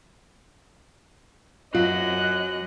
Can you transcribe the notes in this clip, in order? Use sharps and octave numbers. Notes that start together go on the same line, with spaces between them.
F#2 F#3 F4 D#5 F#6